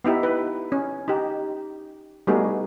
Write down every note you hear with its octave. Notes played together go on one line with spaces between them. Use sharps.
B3 D#4 E4 G4
B4
C#4
D#4 G4
G3 A3 B3 D#4 F#4 G#4